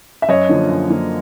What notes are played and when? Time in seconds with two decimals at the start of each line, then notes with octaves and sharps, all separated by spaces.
0.22 E5
0.29 F#2 C#5 D#5
0.49 D3 F3 A#3
0.69 F#2
0.90 D3 F3 A#3